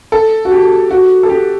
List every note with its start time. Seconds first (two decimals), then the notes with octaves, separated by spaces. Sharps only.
0.12 A4
0.45 F#4
0.52 G4
0.91 F#4
1.23 A4
1.29 G4